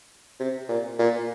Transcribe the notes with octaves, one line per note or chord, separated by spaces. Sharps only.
C3
A#2
A#2